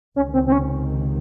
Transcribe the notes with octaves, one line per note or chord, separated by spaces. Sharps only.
C#2 C3 D#3 C#4
C4
C4
C#4